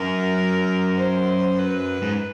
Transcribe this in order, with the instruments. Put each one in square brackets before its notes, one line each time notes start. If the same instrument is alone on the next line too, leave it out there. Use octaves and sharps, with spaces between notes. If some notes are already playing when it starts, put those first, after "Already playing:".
Already playing: [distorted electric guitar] F#2 [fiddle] A#4
[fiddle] C5
B4
[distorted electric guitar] G#2